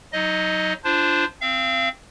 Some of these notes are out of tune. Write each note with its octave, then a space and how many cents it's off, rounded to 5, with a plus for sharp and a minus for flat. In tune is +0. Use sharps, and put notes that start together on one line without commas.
F#3 +0 D#4 +20 D#5 +0
D4 +0 F4 -25 C5 +0
C4 +0 F5 -35